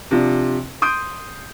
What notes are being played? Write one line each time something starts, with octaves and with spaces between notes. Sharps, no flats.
C3 F3 D4
C6 D#6 G6 D7